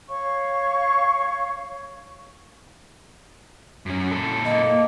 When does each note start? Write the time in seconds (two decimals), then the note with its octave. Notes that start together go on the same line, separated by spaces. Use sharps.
0.09 C#5 F5 C#6
3.86 F#2 C#4
4.11 A#2 A4
4.45 A#3 D#5